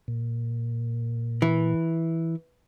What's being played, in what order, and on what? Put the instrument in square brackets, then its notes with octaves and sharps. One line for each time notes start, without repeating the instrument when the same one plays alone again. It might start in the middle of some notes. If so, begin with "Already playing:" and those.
[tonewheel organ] A#2
[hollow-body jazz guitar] E3